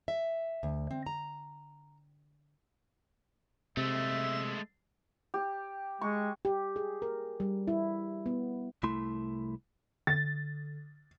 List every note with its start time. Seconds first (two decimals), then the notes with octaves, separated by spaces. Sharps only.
0.08 E5
0.63 D2
0.91 C4
1.07 A#5
3.77 C3 G#3 A3 E5
5.34 G4
6.01 G#3 C#6
6.45 G4
6.76 G#4
7.02 A#4
7.40 G3
7.68 E4
8.26 B3
8.83 C2 A3 E4 C6
10.07 D3 A6